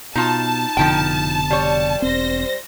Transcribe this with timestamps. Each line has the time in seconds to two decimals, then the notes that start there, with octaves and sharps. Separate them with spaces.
0.15 B2 D#4 F4 A5
0.77 F1 B2 D3 F3 D#4 G5
1.51 G3 C#5
2.02 E1 C4 C5 A#6